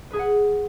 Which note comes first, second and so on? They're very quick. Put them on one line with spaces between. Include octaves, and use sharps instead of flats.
B4 G#4 G#5 F#5